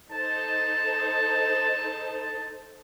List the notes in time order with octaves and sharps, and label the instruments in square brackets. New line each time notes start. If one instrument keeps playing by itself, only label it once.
[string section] D#4 A4 C5 [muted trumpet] A5